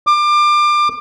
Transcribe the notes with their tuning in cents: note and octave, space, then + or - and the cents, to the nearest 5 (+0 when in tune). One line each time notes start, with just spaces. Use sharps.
D6 +25